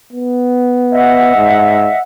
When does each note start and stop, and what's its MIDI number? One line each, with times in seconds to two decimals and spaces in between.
0.13 1.34 59
0.92 1.98 75
0.92 1.98 76
0.92 1.98 78
1.37 1.89 44